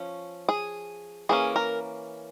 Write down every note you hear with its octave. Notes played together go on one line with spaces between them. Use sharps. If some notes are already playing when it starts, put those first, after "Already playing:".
Already playing: F3 C#4
G#4
E3 A#3 C#4 G#4
A#4